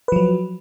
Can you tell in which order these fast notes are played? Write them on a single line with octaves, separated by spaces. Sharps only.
B4 F3 F#3